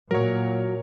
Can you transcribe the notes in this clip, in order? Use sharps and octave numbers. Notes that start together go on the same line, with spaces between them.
A#2 F#3 A#4 C#5